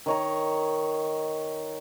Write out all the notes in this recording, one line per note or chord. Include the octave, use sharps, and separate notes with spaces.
D#3 C#5 A#5